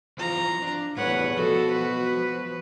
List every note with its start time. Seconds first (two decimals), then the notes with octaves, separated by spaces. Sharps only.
0.18 E3 F3 C4 F4 A#5
0.62 D4
0.97 E2 A2 G3 A4 B4 C#5 F#5
1.37 B2 F3 F#4 A4
1.73 B4